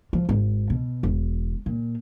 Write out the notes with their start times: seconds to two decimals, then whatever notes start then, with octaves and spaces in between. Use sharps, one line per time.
0.13 F3
0.29 G#1
0.70 B2
1.03 E1
1.66 A#2